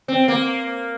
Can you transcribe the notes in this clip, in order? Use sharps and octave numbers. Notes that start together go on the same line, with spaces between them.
C4
A#3